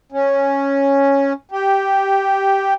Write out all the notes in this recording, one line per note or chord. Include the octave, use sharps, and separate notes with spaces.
C#4
G4